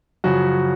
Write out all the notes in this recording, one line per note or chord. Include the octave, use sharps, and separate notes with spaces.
F#2 C#3 F3 F#4